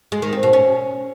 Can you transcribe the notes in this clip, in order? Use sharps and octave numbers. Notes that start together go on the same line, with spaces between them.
G#3
D#3
C4
B2
C#4